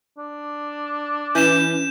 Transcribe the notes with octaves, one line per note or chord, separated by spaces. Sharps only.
D4
E3 C#4 G6 E7